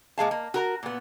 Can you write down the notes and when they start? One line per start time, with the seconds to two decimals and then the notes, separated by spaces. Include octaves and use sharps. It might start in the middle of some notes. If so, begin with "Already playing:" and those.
0.18 A#2 G#3 F5 A5
0.31 A#3
0.54 F#4 A#4 A#5
0.83 A#2 B3